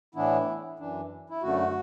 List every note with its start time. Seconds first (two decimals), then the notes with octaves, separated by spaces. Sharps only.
0.15 A2 E3 B3 D4 E4
0.79 F#2 E3 D4
1.30 E4
1.42 F#2 D3 A3 F#4